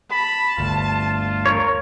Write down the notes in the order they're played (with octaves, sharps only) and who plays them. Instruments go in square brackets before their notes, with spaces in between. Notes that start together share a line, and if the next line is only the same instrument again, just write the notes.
[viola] A5 [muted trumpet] B5
[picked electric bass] G1 D2 [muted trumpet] F4
[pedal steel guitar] A#4 C#5